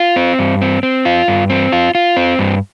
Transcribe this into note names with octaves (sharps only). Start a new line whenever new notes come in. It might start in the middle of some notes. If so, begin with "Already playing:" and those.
Already playing: F4
C4
G2
C4
C4
F4
G2
C4
F4
F4
C4
G2